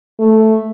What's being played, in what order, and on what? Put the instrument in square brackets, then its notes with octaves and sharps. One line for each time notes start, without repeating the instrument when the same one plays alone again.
[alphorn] A3